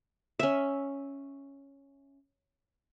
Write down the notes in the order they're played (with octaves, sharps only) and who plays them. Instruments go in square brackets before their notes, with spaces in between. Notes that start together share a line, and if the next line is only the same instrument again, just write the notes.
[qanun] C#4 E5